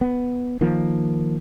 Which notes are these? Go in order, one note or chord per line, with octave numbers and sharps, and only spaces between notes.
B3
D#3 F3 A#3